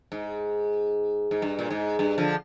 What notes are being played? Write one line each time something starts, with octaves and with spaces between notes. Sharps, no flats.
G#2
G#2
G2
A#2
G#2
G2
D3 F3